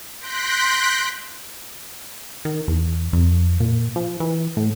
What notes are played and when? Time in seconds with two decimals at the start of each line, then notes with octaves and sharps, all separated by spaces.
0.19 C6 F#6 G6 A#6 B6 D7
2.45 D#3
2.68 E2
3.13 F2
3.60 A#2
3.96 F3
4.20 E3
4.57 A2